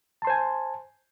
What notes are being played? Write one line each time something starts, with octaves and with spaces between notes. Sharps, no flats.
C5 G#5 A5 C6